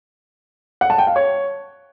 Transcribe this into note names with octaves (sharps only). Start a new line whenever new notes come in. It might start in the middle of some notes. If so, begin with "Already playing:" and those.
F#5
A5
G5
F5
C#5